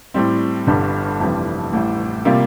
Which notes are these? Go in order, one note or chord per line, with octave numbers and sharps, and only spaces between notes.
A2 G3 C4
G1 G2 D3 G3
F1 F2 E3 G3 C4
A1 A2 G3
C3 G3 A#3 F4